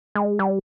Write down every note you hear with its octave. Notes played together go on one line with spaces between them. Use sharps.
G#3
G3